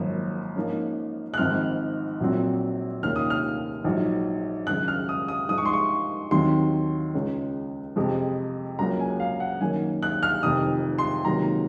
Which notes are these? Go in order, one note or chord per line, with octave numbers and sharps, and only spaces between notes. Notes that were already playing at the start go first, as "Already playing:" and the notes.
Already playing: G#1 F#2 F3 A#3 C#4
G#2 F3 A#3 C#4
F#6
G#1 G#2 F3 C4 F6
A#1 A#2 F#3 C4
F1 D#2 D#3 A#3 C#4 F6
D#6
F6
A#1 G#2 F#3
G#1 F#2 C#3 F#6
F6
D#6
D#6
G#2 F3 G#3 D#6
C#6
C6
C#6
D#2 D#3 F#3 C4 C6
C#2 C#3 G#3 C#4
F2 C3 F3 G#3
C#2 C#3 F#3 A#3 C#4 A#5
G#5
F5
F#5
F#2 D#3 A#3 C#4 G#5
F#6
F6
F1 F2 C3 D#3 D#6
C6
C#2 C3 D#3 F#3 A#3 A#5